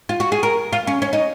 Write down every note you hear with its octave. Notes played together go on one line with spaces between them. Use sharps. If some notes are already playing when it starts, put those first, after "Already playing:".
F4
F#4
G#4
A#4
F4
C#4
C#4
D#4